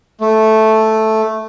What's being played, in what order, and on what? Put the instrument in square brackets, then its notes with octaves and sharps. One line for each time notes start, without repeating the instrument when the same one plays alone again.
[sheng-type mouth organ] A3